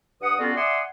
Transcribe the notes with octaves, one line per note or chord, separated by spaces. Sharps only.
G2 B4 F#5 D#6
G3 B3 C#4 F4 F#4 A4
D5 E5 F#5 G#5 C6 D#6